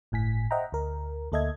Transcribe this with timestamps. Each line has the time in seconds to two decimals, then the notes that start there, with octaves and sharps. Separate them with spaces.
0.12 G1 A2 G#5 B6
0.51 C5 D#5 E5 F#5 G5 A#5
0.72 D2 A#4
1.32 D2 A#3 A4 D#5 E5 G#6